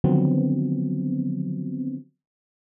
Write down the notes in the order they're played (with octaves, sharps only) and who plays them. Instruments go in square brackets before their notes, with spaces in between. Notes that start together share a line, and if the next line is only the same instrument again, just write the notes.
[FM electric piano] D3 D#3 F3 F#3 B3 C4